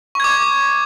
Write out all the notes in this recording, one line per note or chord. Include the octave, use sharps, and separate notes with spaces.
C#6 D6 G#6